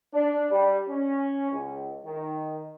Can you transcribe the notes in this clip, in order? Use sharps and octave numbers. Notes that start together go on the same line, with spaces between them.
D4
G3
C#4
C#2
D#3